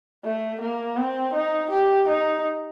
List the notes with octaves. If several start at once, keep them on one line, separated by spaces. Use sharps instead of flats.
A3
A#3
C4
D#4
G4
D#4